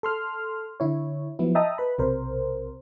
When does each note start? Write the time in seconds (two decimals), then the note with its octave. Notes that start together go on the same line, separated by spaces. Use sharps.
0.03 A4 C6 F6
0.80 D3 E4 C#5
1.39 F3 F#3 B3 E4
1.55 D#5 E5 G5 A5 A#5 D#6
1.78 B4 B5
1.98 B1 C3 A#4 C5